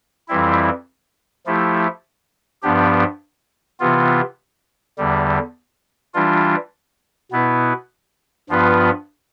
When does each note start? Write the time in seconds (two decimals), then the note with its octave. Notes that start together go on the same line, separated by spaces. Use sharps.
0.28 F2 E3 G3 C4 E4
1.46 F3 A3 E4 G4
2.62 G2 F3 B3 D4 G4
3.80 C3 E3 B3 F4
4.98 E2 D3 G3
6.14 E3 G3 D4 F4
7.32 B2 B3 E4 B4
8.49 G2 F3 B3 F4 B4